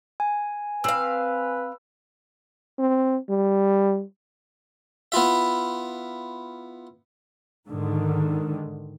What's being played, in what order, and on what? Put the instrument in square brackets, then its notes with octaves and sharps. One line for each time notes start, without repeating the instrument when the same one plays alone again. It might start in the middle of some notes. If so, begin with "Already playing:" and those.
[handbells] G#5
[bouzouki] C4 F5 [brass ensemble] B4 [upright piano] E6
[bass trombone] C4
G3
[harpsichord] B3 E4 F4 E5
[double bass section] G#2 D3 D#3